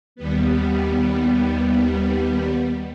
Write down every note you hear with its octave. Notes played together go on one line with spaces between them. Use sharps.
D#2 G3 B3